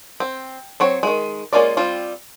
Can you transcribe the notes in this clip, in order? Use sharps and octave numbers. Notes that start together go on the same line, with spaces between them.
C4
F#3 C4 C#5
D#3 G#3
G#3 A#3 C#4 F4 D5
G3 C4 F4